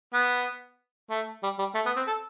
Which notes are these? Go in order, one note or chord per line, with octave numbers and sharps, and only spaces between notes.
B3
A3
G3
G3
A3
B3
C4
A4